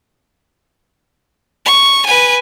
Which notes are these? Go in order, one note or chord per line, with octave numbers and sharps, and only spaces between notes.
C#6
B4 G#5